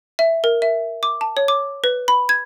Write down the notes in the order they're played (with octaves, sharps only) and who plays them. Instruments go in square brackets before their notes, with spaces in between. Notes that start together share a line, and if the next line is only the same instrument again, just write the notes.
[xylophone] E5
A#4
E5
D6
A5
C#5
D6
B4
B5
G#6